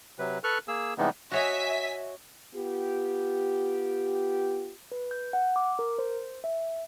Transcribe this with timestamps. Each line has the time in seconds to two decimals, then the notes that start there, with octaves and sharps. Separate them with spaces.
0.19 C3 F#3 B4
0.44 A4 B4 C#6 F6 F#6
0.68 A#3 G#4 E6
0.98 C3 E3 G3 G#3 B3 D#4
1.32 F#4 C#5 D#5 E5 G#5 B6
2.55 B3 F4 G4
4.92 B4
5.11 G6
5.33 F#5
5.56 D6
5.79 A#4
5.98 C5
6.44 E5